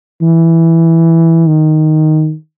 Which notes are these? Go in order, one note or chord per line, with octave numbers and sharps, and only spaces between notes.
E3
D#3